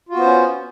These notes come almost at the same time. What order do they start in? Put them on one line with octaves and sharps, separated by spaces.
F4 F#4 B3 C5 C#4